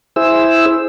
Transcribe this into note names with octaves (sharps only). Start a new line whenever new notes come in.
E4 G#4 C5 E6